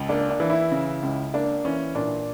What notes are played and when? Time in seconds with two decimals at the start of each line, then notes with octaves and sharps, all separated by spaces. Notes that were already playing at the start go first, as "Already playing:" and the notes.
Already playing: C#2
0.09 A#3 D4
0.30 D4
0.40 E3
0.50 E4
0.71 C#3
1.03 C#2
1.34 A#3 D4
1.65 E3 C#4
1.95 A#2 D4